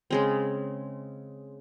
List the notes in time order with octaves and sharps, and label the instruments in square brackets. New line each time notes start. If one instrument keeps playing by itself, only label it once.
[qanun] C#3 G#3 C4